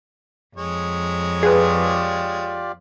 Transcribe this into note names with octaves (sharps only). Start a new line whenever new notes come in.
F2 G#3 C#5
F4 G4 G#4 B4 D5